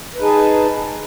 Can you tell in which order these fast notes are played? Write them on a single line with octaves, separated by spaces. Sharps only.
B4 D#4 G#4 A5